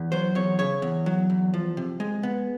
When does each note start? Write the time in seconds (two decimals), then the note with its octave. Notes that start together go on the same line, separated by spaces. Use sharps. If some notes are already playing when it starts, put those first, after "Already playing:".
Already playing: E2
0.12 F#3 C5
0.35 E2 C#5
0.59 C#3 C#5
0.82 E2
1.06 F#3
1.30 E2
1.54 F3
1.77 C3
2.00 G#3
2.23 B3